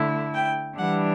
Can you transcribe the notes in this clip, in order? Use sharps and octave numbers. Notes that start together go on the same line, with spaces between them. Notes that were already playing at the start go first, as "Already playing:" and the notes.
Already playing: D3 A3 E4
G5
E3 G3 D4 F#5